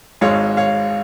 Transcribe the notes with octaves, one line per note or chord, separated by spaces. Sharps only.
G#1 G#2 G#3 C#5 F5
C#5 F5